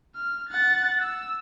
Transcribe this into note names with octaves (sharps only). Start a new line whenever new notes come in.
F6
F#5 A6
E6